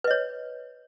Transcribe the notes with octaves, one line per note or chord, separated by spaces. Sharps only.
B4 C#5 D#5